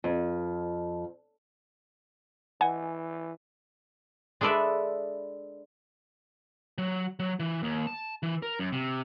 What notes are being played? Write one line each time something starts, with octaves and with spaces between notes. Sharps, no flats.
F2
E3 B4 D#5 F#5 G#5
G#3 D4 A4 B4 D5 E5
F#3
F#3
E3
D#2
A5
E3
A#4
F#2
C3